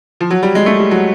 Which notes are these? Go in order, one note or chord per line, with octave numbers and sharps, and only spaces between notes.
F3
F#3
G3
G#3
A3
G3
F#3